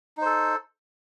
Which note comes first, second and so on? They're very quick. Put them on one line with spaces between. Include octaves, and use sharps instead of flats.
D#4 C5 A4